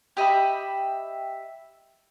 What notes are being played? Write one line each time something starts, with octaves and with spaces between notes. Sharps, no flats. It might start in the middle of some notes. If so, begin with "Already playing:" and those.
G4 D#5 E5 B5